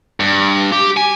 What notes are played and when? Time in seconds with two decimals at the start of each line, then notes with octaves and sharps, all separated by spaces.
0.20 G2
0.72 G4
0.97 G#5